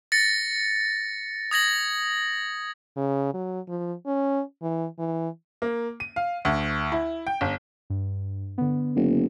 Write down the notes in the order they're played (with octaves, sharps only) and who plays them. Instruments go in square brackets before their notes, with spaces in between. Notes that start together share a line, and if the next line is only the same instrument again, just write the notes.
[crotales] A6 A#6 C#7
D#6 G#6 A#6 F#7
[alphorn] C#3
F#3
F3
C#4
E3
E3
[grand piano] A#3
D#7
F5
D2
E4
G5
G1
[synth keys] G2
D3 B3
[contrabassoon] F#1